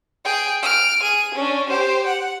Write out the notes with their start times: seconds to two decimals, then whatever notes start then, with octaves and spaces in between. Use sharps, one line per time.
0.25 G#4 G5
0.63 F6 D7
1.01 G#4 D#7
1.35 C#4 D4
1.69 G4 C5
2.07 F#5